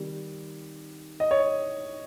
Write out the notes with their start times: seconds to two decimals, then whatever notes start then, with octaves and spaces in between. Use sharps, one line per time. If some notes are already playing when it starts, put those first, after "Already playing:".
Already playing: C3 D#3 G3
1.20 D#5
1.31 C#5